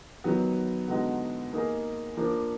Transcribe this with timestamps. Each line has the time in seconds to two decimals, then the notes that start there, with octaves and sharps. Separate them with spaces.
0.24 D#3 F#3 B3
0.88 D3 G#3 B3 D#4 F#4
1.52 A#3 D#4 G#4
2.17 F3 A#3 D4